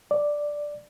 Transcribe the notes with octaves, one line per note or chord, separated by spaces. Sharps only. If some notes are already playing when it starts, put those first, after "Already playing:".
D5